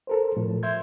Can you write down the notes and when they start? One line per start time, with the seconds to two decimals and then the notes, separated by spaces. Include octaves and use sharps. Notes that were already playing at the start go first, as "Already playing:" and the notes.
0.07 A4 A#4 C5
0.37 A2 F3 A3
0.63 E5 C6 G6 G#6